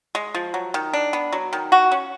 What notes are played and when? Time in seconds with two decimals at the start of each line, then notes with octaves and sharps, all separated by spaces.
0.15 G#3
0.35 F3
0.54 F#3
0.74 D#3
0.93 D4
1.13 B3
1.33 F#3
1.53 D#3
1.72 F#4
1.92 C#4